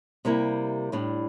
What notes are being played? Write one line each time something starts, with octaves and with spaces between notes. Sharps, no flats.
C3 G3 A#3 E4
A2 G3 D4